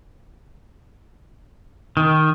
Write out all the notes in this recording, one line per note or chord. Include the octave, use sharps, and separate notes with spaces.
D#3